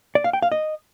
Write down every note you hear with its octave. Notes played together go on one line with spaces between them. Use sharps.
D5
F5
G5
F5
D#5